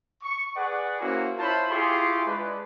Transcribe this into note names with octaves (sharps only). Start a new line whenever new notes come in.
C#6
G#4 B4 D5 F#5
A#3 C#4 E4 F#4 A#4 C5
E4 F4 C5 C#5 A5 B5
E4 F4 G4 G#4 C6 C#6
G#3 D4 B4